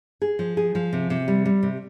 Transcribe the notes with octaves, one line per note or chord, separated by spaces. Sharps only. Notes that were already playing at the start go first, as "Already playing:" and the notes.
G#4
F3
G#4
F3
C3
C3
G3
G3
C3